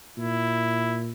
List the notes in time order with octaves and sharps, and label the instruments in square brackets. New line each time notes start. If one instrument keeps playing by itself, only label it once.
[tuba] A#2 [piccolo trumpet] E4